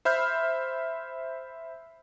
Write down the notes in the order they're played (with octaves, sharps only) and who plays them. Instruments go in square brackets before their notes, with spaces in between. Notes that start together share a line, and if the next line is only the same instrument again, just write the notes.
[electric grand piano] C5 E5 B5 F6 G6